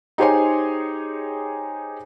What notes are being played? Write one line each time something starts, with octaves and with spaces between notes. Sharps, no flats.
D#4 G4 G#4 C5 C#5 G#5